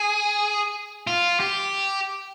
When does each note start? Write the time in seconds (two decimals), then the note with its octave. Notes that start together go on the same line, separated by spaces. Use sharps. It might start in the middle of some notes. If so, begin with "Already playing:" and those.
Already playing: G#4
1.07 F4
1.40 G4